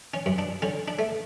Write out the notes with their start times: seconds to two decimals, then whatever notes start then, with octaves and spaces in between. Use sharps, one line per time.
0.14 C#4
0.26 F#2
0.38 D4
0.62 D3 C#4
0.88 D4
0.99 A3